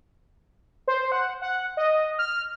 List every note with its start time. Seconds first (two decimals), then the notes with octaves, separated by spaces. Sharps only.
0.88 C5
1.12 F#5
1.42 F#5
1.77 D#5
2.19 F6